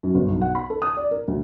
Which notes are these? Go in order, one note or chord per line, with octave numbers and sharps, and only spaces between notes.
F#2
G1
B1
F#5
B5
A4
D#6
D5
A#4
D2